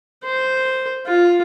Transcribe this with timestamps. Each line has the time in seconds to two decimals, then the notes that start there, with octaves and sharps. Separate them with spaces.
0.25 C5
1.06 F4